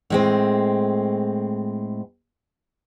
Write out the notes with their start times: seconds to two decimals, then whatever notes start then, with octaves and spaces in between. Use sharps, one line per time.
0.10 A2 G#3 C4